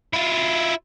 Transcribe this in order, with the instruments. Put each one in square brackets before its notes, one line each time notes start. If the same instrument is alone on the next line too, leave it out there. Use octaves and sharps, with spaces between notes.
[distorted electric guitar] E4 F4